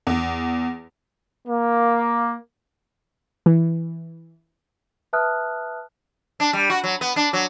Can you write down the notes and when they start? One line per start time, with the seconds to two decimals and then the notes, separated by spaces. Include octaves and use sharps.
0.07 E2
1.47 A#3
3.46 E3
5.13 B4 E5 A5 D#6 F6 F#6
6.40 D4
6.53 G3
6.70 F#4
6.84 F#3
7.01 B3
7.16 D4
7.33 F#3